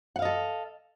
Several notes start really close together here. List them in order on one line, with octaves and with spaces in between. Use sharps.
F#5 F5 D#5 A4